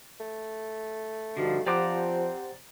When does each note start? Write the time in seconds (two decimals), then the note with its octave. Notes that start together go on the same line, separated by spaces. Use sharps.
0.20 A3
1.37 G2 D3 F3 D#4 F#4
1.66 F3 C4 G4 C5 D5 F#5 A#5 D6